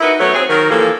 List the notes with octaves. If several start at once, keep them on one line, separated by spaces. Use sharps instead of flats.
D#4 E4 F#4 A#4 B4
F#3 A3 B3 C#5
C4 G#4
D#3 F#3 A#4
E3 F3 G3 A#3 A4